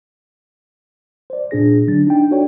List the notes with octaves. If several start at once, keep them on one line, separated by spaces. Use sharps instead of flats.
C5 D5
A#2 D4 G#4 A#6
D3 F#3 D4 A6
D4 D#4 G5
D4 F#4 A4 C#5 D5 G5